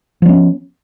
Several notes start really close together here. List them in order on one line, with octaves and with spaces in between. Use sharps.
F3 B3 C#4